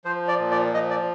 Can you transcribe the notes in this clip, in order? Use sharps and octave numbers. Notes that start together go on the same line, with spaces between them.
F3 C5
D5
A#2
D5
F3 D#5
D5